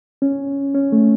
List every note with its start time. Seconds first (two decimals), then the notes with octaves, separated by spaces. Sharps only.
0.22 C#4
0.74 C#4
0.92 A3